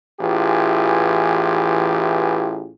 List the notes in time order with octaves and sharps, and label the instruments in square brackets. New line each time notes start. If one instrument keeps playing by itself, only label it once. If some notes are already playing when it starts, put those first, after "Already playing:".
[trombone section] A1 E3 F4 G4 G#4